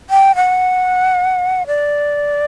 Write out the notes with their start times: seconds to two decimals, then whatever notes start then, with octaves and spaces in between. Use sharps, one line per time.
0.10 G5
0.36 F#5
1.67 D5